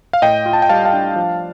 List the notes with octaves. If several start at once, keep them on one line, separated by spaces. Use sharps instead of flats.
F5
A2 D#5 G5
F4
A5
G5
G3 F5 A5
F5 A5
D4
F3